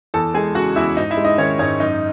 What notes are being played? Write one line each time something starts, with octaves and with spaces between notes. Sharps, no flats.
E2 A4 A5
G#3 G#4 G#5
C#3 F#4 F#5
E2 E4 E5
G#2 D#4 D#5
E4 E5
G#3
D#4 D#5
D#3 C#4 C#5
G#2 C#4 C#5
F#2 D#4 D#5